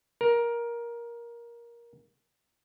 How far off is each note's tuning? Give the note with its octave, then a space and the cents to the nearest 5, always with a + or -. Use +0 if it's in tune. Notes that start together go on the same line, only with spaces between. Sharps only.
A#4 +15